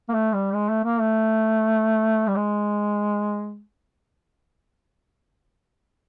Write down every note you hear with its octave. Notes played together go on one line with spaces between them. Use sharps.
A#3
A3
G3
G#3
A3
A#3
A3
G3
G#3